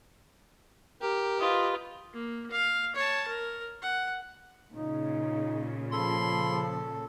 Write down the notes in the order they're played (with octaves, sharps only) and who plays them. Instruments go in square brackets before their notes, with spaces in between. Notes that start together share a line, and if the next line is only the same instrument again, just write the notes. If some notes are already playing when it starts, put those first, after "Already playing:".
[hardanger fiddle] G4 [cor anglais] A#4
[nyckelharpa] F4 B4 [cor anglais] D#5
[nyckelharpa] A#3
F5
C#5 A5
A#4
F#5
[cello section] A#2 C#3 [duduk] D#4
[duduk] F3 [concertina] A4 [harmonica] B5 C6